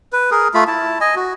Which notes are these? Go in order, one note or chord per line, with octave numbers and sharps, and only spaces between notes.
B4
G#4 A#4
A3 F4 B5
E4 A5
D#5 G#5
F#4